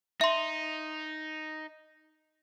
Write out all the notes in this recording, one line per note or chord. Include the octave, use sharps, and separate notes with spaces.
D#4 E5 C6